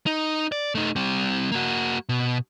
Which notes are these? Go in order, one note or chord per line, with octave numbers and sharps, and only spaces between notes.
D#4
D5
A3 D#4
G3 C4
A#3 F#4
B2